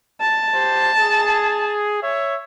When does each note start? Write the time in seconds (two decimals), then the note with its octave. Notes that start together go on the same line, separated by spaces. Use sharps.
0.21 A5
0.54 G4 C5
0.99 G#4
2.02 C#5 E5